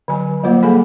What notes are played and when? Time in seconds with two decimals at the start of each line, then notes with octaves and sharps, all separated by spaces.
0.08 D3 F#3 G#5
0.44 F#3 G3 A#3 F4 C5
0.63 G3 A#3 G#4 A4 G#5 B5